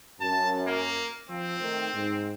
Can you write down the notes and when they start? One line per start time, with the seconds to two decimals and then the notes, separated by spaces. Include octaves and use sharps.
0.20 F#2 A5
0.67 A#3
1.29 F3 C4
1.61 D#3 A3
1.94 G#2